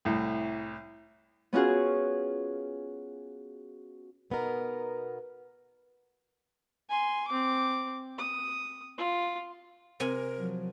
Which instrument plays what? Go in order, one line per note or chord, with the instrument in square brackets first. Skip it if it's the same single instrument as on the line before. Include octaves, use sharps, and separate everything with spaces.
[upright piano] C2 A2
[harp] B3 C#4 F4 F#4 G#4
[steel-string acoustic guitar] B2 B3 D#4 A#4
[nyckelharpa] G#5 C6
C4 D6
D#6
F4
[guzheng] C3 G#5 [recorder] A#4
[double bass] F3 F#3